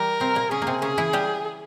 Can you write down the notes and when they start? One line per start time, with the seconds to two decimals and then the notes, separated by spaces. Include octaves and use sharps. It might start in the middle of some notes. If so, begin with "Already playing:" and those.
Already playing: E3 G3 G4 A#4
0.20 C3 C4
0.35 A#2 A#3
0.51 C#3 C#4 G#4
0.62 A#3
0.67 C3 C4
0.82 C#3 C#4 G#4
0.98 E3 E4
1.13 G3 G4